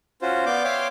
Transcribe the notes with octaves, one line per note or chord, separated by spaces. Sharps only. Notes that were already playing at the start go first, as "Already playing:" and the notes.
C#4 F4 F#4 C5
B3 D5 F5 D6 G6
C#5 E5 F5 G5 C6 D6